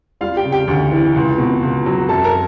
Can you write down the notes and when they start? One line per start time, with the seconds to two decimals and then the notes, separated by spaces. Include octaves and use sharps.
0.21 G3 F4 F5
0.36 G4 G5
0.44 C#3
0.52 G4 G5
0.68 D2
0.92 E3
1.16 C#2
1.38 B2
1.63 C#2
1.86 F#3
2.08 F#2 A4 A5
2.24 A#4 A#5